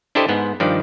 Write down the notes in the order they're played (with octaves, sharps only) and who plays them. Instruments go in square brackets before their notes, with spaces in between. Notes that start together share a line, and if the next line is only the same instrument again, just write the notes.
[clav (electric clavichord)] D4 E4 G4 A4 C5 D#5
G#2 B3
G2 D#3 F3 D5